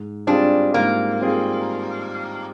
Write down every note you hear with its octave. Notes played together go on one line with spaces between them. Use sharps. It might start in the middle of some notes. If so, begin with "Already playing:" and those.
Already playing: G#2
G3 C4 D4 F4 G#4
G#2 A#3
G3 C4 F4 G#4